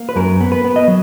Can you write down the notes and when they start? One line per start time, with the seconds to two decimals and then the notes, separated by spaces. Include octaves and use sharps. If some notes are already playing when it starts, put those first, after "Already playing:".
Already playing: A#3
0.09 B4
0.16 F#2 A#4
0.41 B3
0.52 B4
0.64 B3
0.76 D#5
0.88 F#3